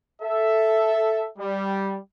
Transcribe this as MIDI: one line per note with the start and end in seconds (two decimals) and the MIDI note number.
0.22 1.29 69
0.22 1.29 76
1.38 1.97 55